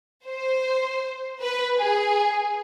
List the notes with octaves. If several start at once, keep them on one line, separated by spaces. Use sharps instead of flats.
C5
B4
G#4